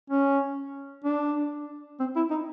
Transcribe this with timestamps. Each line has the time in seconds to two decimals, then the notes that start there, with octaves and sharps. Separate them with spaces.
0.10 C#4
1.04 D4
2.00 C4
2.16 E4
2.31 D#4